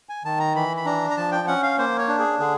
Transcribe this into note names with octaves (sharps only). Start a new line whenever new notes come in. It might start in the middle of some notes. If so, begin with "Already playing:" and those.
G#5
D#3 A5
A#5
E3 B5
B5
D4 A#5
A#5
F3 A5
G5
C#4 F#5
F5
A#3 C5
C#5
D4
G#4
D3 G#4